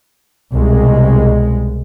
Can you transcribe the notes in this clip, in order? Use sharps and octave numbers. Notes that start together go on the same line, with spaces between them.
C2 B2 G#3